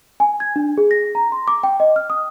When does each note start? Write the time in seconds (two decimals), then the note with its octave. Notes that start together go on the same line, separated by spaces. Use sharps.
0.20 G#5
0.40 G#6
0.56 D4
0.78 G#4
0.91 A#6
1.15 A#5
1.32 C6
1.48 D6
1.63 G5
1.80 D#5
1.96 F6
2.10 D#6